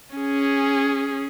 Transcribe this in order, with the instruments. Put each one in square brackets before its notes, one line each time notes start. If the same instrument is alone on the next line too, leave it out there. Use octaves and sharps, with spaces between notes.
[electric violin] C#4 G#4